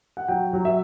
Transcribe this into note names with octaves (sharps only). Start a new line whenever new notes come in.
F#5
F#3 G5
F#3
E5